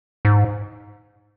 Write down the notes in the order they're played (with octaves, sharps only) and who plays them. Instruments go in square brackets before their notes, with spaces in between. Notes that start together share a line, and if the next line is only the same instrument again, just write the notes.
[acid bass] G#2